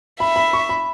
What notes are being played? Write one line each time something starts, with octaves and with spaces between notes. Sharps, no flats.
E5 B5
B5
C#6
B5